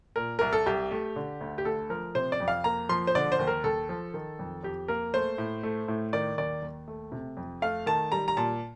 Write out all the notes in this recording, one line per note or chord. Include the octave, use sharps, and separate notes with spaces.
A#2 A#4
C2 A#4
A4
C2 G4
A3
D3
D2
G4
A3 A4
F3 A#4
C3 C5
D5
F2
F5
A#3 A#5
F3 C6
C5
D3 D5
C5
D#2
A#4
D#2 A4
F3
D#3
F2
F2 G4
A#3 A#4
A3 C5
A2
A3
A2
D#3 D5
D#2 D5
D#2
A3
C3
F2
A3 F5
D#3 A5
G3 A#5
A#5
A#2 A5